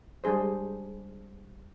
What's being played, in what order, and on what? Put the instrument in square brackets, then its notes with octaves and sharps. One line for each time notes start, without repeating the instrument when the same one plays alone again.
[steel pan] G3 G#3 D4 G#4 C5